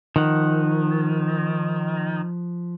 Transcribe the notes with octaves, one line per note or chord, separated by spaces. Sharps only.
D#3 F3 F#5